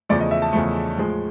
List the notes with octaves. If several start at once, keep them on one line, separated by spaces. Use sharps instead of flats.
E2 C#3 F3 A3 D5
D#5
E5
A5
E2 C#3 F3 A3
A2 F3 G#3